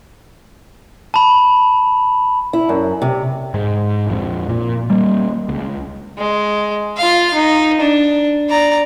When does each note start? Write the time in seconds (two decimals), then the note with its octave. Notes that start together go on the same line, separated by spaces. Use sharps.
1.14 A5 B5
2.53 E4
2.69 F#2
3.02 C3
3.54 G#2 G#3
4.07 A#1 F2
4.49 A#2
4.90 G3 A#3
5.48 C#2
6.18 G#3
6.97 F4 F5
7.34 D#4
7.80 D4
8.49 D5 A#5